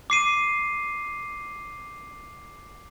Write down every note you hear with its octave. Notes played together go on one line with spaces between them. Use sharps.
D6 C7 D#7